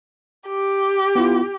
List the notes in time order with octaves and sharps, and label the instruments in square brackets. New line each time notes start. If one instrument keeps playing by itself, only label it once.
[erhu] G4
[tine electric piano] B3 E4 F4